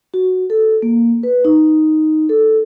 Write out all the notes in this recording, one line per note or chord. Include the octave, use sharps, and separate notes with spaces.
F#4
A4
A#3
B4
D#4
A4